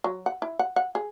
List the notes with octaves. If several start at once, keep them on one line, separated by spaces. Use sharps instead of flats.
F#3
F#5
E4
F#5
F#5
G#4